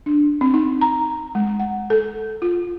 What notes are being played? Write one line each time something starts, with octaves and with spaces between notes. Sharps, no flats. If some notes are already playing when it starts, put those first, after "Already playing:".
D4
C4
D#4
A#5
G#3
F#5
A4
F4